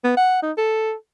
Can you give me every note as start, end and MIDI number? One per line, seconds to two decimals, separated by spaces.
0.04 0.14 59
0.17 0.39 78
0.42 0.52 63
0.57 0.93 69